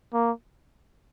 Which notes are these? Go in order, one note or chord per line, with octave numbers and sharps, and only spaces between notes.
A#3